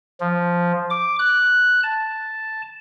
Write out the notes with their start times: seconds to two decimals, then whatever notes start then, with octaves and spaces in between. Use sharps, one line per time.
0.21 F3
0.90 D6
1.19 F#6
1.83 A5